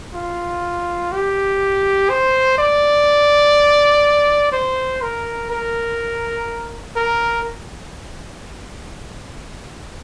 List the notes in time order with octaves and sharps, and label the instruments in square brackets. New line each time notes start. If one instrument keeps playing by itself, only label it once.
[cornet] F4
G4
C5
D5
C5
A#4
A#4
A#4